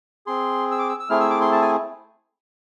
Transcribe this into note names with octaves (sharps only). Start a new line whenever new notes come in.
C4 G#4 C6
E6
D6
E6
E6
A3 C4 E4 G#4 F6
E6
D6
C6
A5
G#5